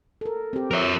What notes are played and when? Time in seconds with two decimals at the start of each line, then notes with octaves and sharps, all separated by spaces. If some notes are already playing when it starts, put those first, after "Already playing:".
0.21 A4 A#4
0.53 C4 G4
0.71 F3 A#4 C#5 E5